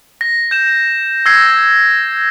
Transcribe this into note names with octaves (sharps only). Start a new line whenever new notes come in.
A#6
G6 E7
E6 G#6 A#6 C7